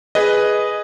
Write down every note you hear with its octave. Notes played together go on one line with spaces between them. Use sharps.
G#4 B4 D#5